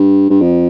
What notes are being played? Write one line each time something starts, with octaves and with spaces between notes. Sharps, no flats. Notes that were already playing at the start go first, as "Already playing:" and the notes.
Already playing: G2
G2
F2